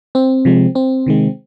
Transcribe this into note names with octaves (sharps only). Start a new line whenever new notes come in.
C4
C3 F3 G#3
C4
C3 D#3 G#3